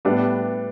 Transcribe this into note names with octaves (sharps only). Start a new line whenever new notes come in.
A2 G3 B3 D4